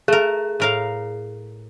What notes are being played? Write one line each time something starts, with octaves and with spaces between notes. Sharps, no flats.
A3 G#4 A#4
A2 A#4 F5